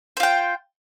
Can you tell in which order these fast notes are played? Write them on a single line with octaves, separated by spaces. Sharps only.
C5 F4 G5